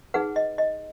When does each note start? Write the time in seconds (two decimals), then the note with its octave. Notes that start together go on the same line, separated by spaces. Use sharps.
0.14 D#4 G#4 B4 F#5
0.36 D#5
0.58 D#5